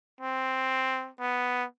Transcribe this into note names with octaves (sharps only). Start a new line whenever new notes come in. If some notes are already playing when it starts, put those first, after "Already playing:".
C4
B3